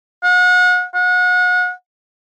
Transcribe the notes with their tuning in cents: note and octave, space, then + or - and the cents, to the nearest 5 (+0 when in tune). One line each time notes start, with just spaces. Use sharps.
F#5 -35
F#5 -35